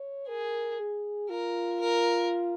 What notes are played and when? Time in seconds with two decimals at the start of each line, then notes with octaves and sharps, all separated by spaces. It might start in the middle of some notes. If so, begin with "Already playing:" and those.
Already playing: C#5
0.28 G#4 A#4
0.79 G#4
1.30 F4 A#4
1.80 A#4